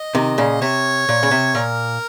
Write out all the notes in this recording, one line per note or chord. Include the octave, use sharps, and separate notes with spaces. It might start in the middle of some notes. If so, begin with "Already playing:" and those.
Already playing: D#5
C3 D#3
A#2 C#3
C3 C#5
A#2
C#3
C3
A#2 A#4